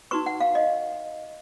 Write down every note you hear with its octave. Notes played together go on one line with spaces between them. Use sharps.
D#4 F#4 B4 C#6
F#5
F5
D#5